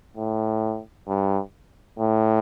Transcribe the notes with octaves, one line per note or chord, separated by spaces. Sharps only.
A2
G2
A2